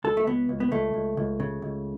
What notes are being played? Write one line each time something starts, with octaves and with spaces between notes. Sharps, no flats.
C#2 A4
A3
C#2 B3
C#2
B3
C#2 A3
C#2
C#2
C#3
C#2